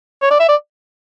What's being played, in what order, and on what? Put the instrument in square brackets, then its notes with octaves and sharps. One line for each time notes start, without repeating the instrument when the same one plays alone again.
[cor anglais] C#5
D5
E5
D5